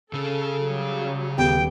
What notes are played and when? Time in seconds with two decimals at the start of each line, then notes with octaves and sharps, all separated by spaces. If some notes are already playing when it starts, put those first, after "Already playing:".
0.13 C#3 G#4 A4
0.60 F#3 G3
1.38 D#1 B3 G4 G5